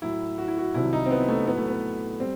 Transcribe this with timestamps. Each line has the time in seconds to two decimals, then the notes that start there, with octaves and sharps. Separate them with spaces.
0.02 A2 F#3 E4
0.38 F#4
0.48 E4
0.58 F#4
0.74 C2 C3 D#3 F#3 E4
0.93 D#4
1.06 C4
1.11 B3
1.28 A3
1.47 A2 F#3 B3
1.58 A3
1.68 B3
2.20 G3 C4